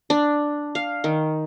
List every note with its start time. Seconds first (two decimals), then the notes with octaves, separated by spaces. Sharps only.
0.10 D4
0.75 F5
1.04 D#3